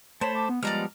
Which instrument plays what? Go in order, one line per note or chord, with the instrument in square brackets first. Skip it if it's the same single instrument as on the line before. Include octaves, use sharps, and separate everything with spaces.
[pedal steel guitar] A3 A5 B5 [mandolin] C5 [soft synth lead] C#5
[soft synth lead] D6
B3
[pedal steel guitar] F3 G3 B3 [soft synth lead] G#3 [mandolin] D5 A#5 F6